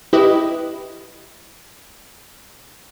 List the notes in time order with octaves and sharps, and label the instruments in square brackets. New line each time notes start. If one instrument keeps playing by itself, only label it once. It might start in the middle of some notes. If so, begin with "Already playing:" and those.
[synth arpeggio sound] E4 G4 B4 D#5